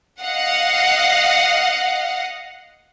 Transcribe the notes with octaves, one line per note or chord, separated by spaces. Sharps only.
D#5 F5 F#5